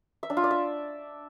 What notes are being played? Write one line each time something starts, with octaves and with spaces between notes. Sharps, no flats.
E5
D4
F4
D5
E5